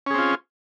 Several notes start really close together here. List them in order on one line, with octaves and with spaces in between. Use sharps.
C#4 G#4 C4 F4